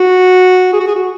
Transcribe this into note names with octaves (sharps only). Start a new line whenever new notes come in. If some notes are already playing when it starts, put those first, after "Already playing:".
Already playing: F#4
G#4
F#4
G#4
F#4